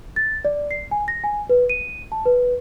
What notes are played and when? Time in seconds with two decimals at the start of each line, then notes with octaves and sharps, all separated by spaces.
0.16 A6
0.45 D5
0.71 C7
0.91 G#5
1.08 A#6
1.24 G#5
1.49 B4
1.70 D#7
2.12 A5
2.25 B4